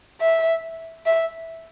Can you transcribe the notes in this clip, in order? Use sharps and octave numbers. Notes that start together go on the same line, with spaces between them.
E5
E5